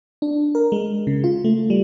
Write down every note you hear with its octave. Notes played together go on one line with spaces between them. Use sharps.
D4
A#4
G#3
C#3
F4
A3
G3